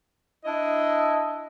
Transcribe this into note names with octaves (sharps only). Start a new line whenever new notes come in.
D4 E4 D#5